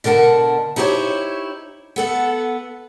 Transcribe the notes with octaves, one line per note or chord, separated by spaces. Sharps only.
B2 D3 A#4 F#5 A5
D#4 E4 G4 G#4 C5 C#5
B3 A4 F#5